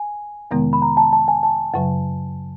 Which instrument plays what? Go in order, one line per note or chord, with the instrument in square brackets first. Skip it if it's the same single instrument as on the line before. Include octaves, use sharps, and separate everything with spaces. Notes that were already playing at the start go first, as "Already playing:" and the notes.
Already playing: [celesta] G#5
[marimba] F2 C3 D#3 G#3 B3
[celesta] B5
A#5
A5
A5
G#5
A5
[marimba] F#2 C#3 F#3